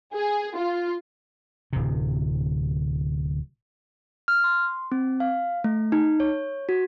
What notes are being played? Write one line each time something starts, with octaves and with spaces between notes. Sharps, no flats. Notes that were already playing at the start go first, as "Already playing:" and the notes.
G#4
F4
D1 C3
F6
C6
C4
F5
A3
D#4
C#5
F#4